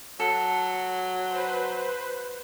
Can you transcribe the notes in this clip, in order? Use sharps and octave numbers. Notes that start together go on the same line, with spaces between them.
F#3 A4
B4 C5